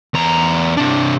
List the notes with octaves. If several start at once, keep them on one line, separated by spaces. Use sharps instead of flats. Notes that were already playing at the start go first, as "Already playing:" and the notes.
E2 A#5
C3 D4